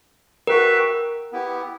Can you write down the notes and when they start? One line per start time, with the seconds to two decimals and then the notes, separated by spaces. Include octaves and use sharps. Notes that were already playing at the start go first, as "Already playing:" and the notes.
0.47 F#4 A#4 B4 E5 G5
1.32 B3 E4 G4